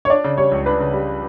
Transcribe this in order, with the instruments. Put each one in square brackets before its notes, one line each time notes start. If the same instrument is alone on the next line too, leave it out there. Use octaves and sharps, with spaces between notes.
[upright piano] C#5
[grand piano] D4 [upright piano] D5
[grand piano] C#3
[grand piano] G3 [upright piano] C#5
[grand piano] C#2
[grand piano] D4 [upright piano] B4
[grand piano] C#3
G3